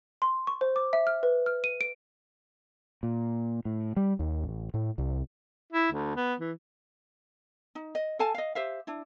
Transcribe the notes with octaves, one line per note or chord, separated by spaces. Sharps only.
C6
C#6
C5
D6
E5
F6
B4
F6
D#7
D7
A#2
A2
G3
D#2
A1
A2
C2
E4
D2
B3
E3
D#4
D#5
A4 F5 G#5 A5
D#5 F5
G4 C5 E5 F5
D4 E4